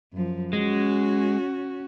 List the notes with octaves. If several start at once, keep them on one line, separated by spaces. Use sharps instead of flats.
F#2 F3
G#3 C#4 F#4